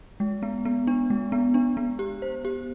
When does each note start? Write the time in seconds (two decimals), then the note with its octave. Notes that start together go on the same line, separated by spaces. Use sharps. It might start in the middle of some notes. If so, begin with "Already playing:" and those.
0.20 G#3
0.43 B3
0.65 B3
0.87 D4
1.10 G#3
1.32 B3
1.54 D4
1.77 B3
1.99 G4
2.22 C5
2.45 G4